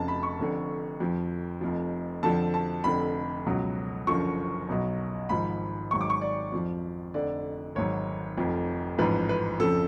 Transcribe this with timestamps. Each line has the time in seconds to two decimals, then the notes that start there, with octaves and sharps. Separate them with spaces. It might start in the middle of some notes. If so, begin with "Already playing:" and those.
Already playing: F1 F2 C#3 A5
0.08 B5
0.23 C#6
0.39 F1 F2 D3
1.00 F2 F3
1.61 F1 F2 F3
2.23 F2 D3 F3 A5
2.54 A5
2.84 F1 F2 D3 B5
3.46 C#2 B2 F#3
4.07 F#1 F#2 D3 F3 C#6
4.69 B1 B2 F#3
5.29 G#1 G#2 F3 B5
5.91 G#1 G#2 F#3 C#6
6.01 D6
6.10 C#6
6.21 D5
6.52 F2 F3
7.14 F1 F2 D3 D5
7.75 G#1 G#2 F#3 C#5
8.37 F1 F2 F3
8.98 A1 G#2 F3 B4
9.29 B4
9.60 F2 C#3 F3 A4